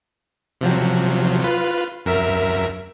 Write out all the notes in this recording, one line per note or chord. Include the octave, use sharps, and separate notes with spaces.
C3 F3 F#3
F4 B4
F#2 A#4 E5